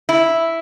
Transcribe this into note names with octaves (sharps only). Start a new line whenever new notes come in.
E4